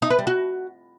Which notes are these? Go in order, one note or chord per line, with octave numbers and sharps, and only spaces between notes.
D#4
B4
G3
F#4